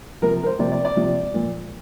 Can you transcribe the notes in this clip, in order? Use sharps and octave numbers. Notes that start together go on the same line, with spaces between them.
C3 F3 A#4
A#4
C5
C3 F3 D5
D5
D5
C3 F3
A#2 F3